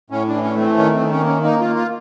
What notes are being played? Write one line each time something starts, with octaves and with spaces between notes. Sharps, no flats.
A2 C#4
E3 D4
C#4
A3 C4
D#3 C#4
C4
D#3
C#4
A#3
C#4
A#3 D#4
A#3 F4
F4